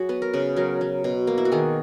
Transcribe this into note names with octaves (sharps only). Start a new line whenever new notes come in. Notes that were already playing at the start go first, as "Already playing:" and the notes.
Already playing: F#3 F#4 G#4
B3 B4
A#4
C#3 B4
F#3 A#4
F#3
B2
A#3
E4
F#4
D#3 G#4